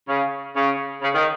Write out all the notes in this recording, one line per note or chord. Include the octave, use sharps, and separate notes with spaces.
C#3
C#3
C#3
D#3